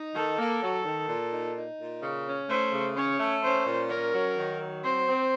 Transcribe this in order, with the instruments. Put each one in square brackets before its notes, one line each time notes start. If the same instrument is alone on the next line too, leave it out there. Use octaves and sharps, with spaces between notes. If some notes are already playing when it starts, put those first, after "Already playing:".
Already playing: [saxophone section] D#4
[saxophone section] D#3 [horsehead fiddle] A4
[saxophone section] A#3
F#3
D#3
A#2
D#4
D#4
A#2
C#3
C#4
[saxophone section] A3 [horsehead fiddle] C5
[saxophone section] C#3
[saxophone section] C#4 [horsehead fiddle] C#5
[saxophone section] A3
[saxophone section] C#4 [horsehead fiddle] C5
[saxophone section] A#2
[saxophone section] C#4 [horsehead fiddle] A#4
[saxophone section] F#3
D#3
F#3
[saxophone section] C4 [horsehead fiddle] C5
[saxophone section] C4